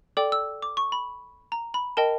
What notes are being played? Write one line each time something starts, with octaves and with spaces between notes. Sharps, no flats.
A4 D5 G5 D6
E6
D6
C#6
B5
A#5
B5
A#4 D#5 G5 A5